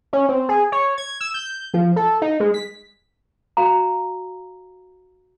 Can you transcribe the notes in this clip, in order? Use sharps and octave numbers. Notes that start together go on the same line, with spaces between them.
C#4
C4
G#4
C#5
G#6
E6
G6
F3
A4
D#4
G#3
B6
F#4 F5 A#5